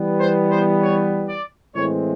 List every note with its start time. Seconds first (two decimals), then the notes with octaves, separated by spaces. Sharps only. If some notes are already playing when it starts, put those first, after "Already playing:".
Already playing: E3 G3 B3
0.20 C5
0.50 C5
0.81 C#5
1.28 D5
1.75 A2 E3 G#3 C4 C#5